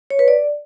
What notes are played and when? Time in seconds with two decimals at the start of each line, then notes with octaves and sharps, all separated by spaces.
0.10 C#5
0.19 B4
0.28 D5